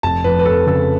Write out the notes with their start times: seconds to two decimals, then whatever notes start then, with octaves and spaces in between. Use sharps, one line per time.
0.03 F1 A5
0.24 F2 B4
0.39 B4
0.45 F1 A4
0.67 C#3 A4